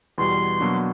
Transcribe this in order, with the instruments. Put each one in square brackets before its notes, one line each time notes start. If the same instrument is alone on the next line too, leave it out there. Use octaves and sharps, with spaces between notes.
[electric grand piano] E2 B2 G3 [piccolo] C6
[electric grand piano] B2 F#3 A#3 D4 F#4